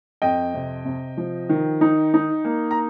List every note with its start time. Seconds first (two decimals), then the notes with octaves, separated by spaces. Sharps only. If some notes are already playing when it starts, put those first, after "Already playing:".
0.22 F2 D#5 G5
0.54 C3
0.85 C3
1.17 F3
1.49 D#3
1.81 D#4
2.14 D#4
2.45 A#3
2.71 A#5